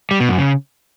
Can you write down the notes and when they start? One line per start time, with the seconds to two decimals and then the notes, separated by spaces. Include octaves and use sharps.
0.11 G3
0.20 B2
0.29 F#2
0.38 C#3